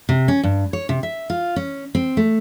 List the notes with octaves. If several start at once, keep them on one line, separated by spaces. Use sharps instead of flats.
C3
C#4
G2
C#5
C3
E5
F4
C#4
C4
A3